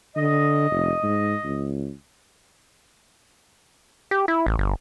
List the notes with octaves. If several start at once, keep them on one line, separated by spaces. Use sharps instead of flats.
D3 D#5
F1
G#2
C#2
G4
E4
A1
G1